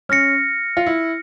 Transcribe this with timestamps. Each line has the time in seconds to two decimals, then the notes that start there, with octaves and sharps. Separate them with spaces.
0.09 C#4 F6 A#6 C#7
0.77 F4
0.86 E4